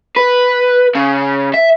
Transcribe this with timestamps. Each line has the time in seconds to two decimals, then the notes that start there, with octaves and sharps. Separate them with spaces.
0.16 B4
0.95 C#3
1.54 E5